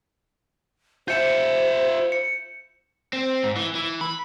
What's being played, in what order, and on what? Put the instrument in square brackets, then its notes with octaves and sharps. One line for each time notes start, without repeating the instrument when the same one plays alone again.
[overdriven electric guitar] F4 E5 [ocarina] C5 [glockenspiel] G6 C#7 E7
[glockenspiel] C#7
[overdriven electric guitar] C4
G#2
E3
E3
B5